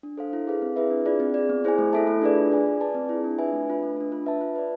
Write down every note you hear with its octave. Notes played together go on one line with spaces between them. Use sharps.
D4
A4 C5 F5
E4
G#4 B4 F5
C4
E4 G#4 B4 E5
D4
F4 G#4 D5
C4
G#4 D5
B3
E4 G#4 C5 G#5
A3
E4 A4 E5 A5
A3
D4 G#4 B4 D5
F4
G#4 D5 G#5
F4
B4 D5 A5
C4
E4 G#4
D4
F4 B4 E5 G#5
A3
D4 F4 B4
A3
D4 F4
F4
B4 E5 A5
F4
B4 D5